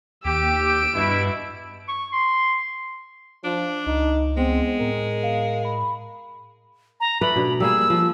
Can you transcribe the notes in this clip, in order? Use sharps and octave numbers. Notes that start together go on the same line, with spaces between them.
D#2 G4 E6 D7
G2 B2 E4
C#6
C6
F3 D4
C#2 D#4
G#3 B3 C4
A2 A#4
F5
B5
A#5
A3 B4 D5 B5
B2 D4
G3 A#3 G#4 E6
F3